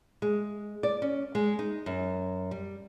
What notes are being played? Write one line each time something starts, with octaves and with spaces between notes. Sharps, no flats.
G#3
D5
C#4
G#3
D#4
F#2
G3